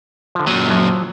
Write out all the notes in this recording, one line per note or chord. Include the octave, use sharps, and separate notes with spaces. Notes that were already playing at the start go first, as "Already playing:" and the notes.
D3 F3
F#2 A#2 F#3
F3 F#3